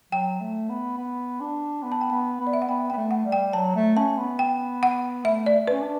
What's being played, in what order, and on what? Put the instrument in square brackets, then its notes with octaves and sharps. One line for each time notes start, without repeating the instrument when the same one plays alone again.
[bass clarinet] F#3 [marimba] G5
[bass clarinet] A3
B3
B3
D4
B3
[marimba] A5
G5
[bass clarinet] B3 [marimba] A5
[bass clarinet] B3
[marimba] D5
E5
F#5
[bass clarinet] B3 [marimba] G5
[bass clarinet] B3 [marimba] G5
[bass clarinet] A3
[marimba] F#5
[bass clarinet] G3
[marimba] G5
[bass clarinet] F#3 [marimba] A5
[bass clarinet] A3
[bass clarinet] C#4 [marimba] A5
[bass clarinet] B3
[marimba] G5
F#5
[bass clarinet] A3 [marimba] E5
[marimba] D5
[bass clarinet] C#4 [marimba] B4
[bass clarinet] D4